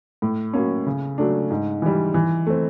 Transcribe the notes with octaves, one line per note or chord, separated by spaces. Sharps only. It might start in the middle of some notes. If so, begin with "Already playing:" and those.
A2
F#3 A#3 C#4
C#3
F#3 A3 D4
G#2
E3 G3
E3
A3 C4